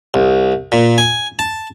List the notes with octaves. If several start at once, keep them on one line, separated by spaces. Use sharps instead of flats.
C2
A#2
G#5
A5